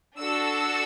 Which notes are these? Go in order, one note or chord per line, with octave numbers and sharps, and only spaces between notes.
D4 F#4 A4 E6